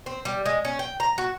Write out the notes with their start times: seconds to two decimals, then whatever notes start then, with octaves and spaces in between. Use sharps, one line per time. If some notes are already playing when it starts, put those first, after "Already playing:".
0.06 C4
0.25 G3
0.46 G#3
0.65 C#4
0.79 G5
1.00 A#5
1.18 F#4